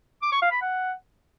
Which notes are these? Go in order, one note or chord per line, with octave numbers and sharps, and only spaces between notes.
D6
C#6
F5
B5
F#5